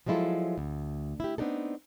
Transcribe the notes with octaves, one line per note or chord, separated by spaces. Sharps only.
F3 F#3 G#3 E4 F4 A4
D2
E4 G4
B3 C4 D4 D#4 A4